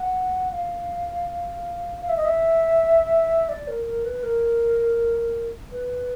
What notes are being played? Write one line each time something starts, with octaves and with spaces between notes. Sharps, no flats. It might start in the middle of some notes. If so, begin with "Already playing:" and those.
Already playing: F#5
F5
F5
E5
D#5
E5
D5
A#4
A#4
B4
A#4
B4